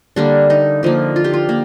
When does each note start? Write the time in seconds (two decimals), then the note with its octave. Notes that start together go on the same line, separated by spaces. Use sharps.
0.16 D3 G3 A#3 D4
0.50 D#4
0.83 D3 F3 A#3
1.16 F4
1.24 G4
1.34 F4
1.49 A#3